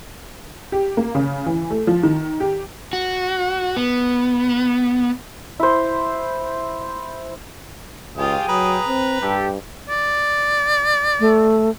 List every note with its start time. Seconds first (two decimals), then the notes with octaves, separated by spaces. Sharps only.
0.72 G4
0.97 A#3
1.15 C#3
1.46 E3
1.70 A3
1.87 F3
2.03 D#3
2.40 G4
2.93 F#4
3.77 B3
5.60 E4 C5
8.17 C#2 F4 G4 G#4 G5 D#6
8.48 F#3 B4 A#5
8.88 C4
9.22 G2 G4 A4
9.89 D5
11.20 A3